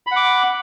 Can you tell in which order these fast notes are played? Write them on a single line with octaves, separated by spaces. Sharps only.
B5 F#5 D6